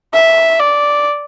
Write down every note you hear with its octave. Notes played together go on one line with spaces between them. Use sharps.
E5
D5